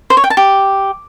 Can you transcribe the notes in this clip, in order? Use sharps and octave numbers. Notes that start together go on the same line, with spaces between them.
C5
C#5
G5
A5
G4